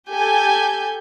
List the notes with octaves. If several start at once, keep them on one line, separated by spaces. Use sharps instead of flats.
G4 A4 G#5 G6